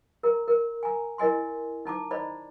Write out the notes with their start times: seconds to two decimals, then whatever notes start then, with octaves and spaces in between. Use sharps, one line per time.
0.23 A#4 A#5
0.48 A#4
0.83 G#5 A#5
1.18 E4 A#4 D#5 G#5 C6
1.86 D#4 A5 A#5 D6
2.11 C5 D5 D#5 A#5 B5